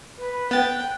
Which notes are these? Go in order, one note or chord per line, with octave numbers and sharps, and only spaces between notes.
B4
B3 G5 F#6 A6